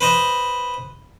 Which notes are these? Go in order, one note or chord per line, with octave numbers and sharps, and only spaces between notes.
B4 C5 D#5